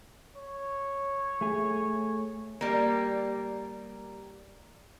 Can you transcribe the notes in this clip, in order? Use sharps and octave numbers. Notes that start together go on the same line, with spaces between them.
C#5
A3 G#4
G3 A#3